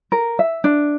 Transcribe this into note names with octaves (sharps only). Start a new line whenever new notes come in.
A#4
E5
D4